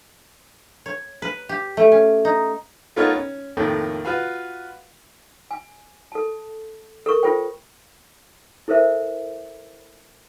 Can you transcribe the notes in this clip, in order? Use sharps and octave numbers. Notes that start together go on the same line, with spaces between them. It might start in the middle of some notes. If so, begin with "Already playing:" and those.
C#5
B4
G4
A3
C#4
D#4
A3 B3 D#4 F4 A#4 C#5
C#4
F2 A2 D#3 A3 A#3
F4 F#4 B4 F5
G#5
A4 A5
A4 A#4 C#6
F4 A4 C5 G5
E4 A4 A#4 C5 E5